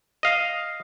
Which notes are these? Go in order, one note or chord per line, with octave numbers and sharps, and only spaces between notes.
D#5 F5